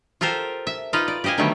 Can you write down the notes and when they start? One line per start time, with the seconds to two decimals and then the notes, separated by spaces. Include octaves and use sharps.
0.21 F4 G4 A4 A#4 C5
0.67 E5
0.93 D#4 F4 B4 D#5 F5
1.08 D5
1.24 G4 C5 D#5 F5 G#5
1.38 D3 D#3 F#3 G3 A3 B3